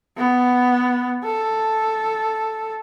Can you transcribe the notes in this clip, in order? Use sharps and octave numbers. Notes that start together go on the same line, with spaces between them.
B3
A4